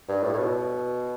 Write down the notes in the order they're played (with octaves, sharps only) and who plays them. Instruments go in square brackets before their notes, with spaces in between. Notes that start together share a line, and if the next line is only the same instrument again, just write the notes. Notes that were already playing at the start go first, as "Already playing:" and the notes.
[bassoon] G2
A2
A2
B2